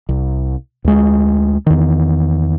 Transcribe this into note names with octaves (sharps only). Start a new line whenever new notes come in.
C2
D2 G#3
E2 D#3